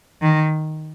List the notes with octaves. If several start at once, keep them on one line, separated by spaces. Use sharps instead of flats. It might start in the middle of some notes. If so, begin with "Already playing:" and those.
D#3